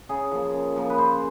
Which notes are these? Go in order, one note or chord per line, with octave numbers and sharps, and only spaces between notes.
C#3 G#4
F3 A#3
C#3
F3 A#3
B4
C#3 C5